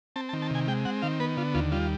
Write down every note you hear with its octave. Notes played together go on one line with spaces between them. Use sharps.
C4 A5
A5
D#3
A5
C3 G#5
G#3 G5
C4 F#5
D#3 F5
B3 B4
D3 F4
D#2 F4
G3 F4